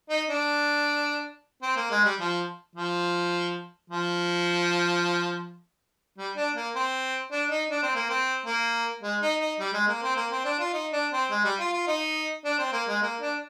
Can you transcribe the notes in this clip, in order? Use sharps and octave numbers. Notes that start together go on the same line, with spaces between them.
D#4
D4
C4
A#3
G#3
G3
F3
F3
F3
G3
D4
A#3
C4
D4
D#4
D4
C4
A#3
C4
A#3
G#3
D#4
D#4
G3
G#3
A#3
C4
A#3
C4
D4
F4
D#4
D4
C4
G#3
G3
F4
F4
D#4
D4
C4
A#3
G#3
A#3
D4